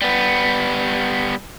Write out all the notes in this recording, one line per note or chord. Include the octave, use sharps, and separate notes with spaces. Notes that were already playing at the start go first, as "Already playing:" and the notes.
G3 B3